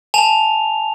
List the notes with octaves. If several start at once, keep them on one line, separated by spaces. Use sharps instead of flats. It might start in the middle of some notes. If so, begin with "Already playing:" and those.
G#5 A5 F7